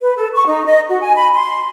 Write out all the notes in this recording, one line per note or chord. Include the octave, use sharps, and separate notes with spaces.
B4
A4
C#6
D#4
D#5
F#4
G#5
B5
C6